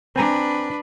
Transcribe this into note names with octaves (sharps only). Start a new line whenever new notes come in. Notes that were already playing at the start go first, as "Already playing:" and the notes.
C4 D4 B4 G#5 A#5